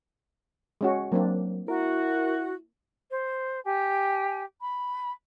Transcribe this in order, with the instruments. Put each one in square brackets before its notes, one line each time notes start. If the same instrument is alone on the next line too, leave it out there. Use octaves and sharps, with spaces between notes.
[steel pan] G#3 C#4 F#4
[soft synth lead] F#3 [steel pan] A#3 C4 D4
[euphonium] E4 [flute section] F#4 [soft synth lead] A#4
[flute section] C5
G4 G#5
B5